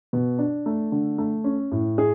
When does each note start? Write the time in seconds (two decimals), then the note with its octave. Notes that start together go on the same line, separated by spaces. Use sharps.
0.13 B2
0.38 D4
0.66 A3
0.92 D3
1.18 A3
1.44 C#4
1.72 A2
1.98 G#4